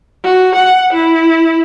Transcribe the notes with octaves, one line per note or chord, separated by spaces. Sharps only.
F#4
F#5
E4